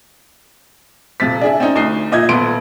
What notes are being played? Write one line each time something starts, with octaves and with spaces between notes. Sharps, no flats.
D#1 C3 A6 B6
D4 G#4 E5
C4 C#4 D#4
D2 D#4 C7
A#2 D#5 E5 G#6
D#1 B3 C6 D7